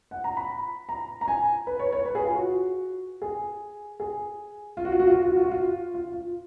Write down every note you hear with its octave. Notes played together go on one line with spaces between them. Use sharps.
F#5
A#5
B5
A#5
A#5
G#5
B4
C#5
C#5
B4
G#4
F4
F#4
G#4
G#4
F4
F#4
F4
F#4
F4
F#4
F4
F#4
F4
F#4
F4
F4
F4